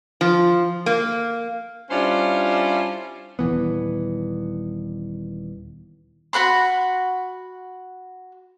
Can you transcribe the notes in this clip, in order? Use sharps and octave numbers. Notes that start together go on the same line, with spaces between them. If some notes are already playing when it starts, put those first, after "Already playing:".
F3
A#3
G3 C#4 D4 E4 F4 C5
D#1 G#1 E3 B3
F#4 F#5 B5 C6